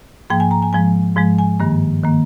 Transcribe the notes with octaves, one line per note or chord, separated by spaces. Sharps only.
G#2 F3 A#3 G5
G#5
A#5
G#5
G#2 F3 G#3 G#5
G#2 F3 G#3
G#5
G2 D#3 A#3
D#3 A#3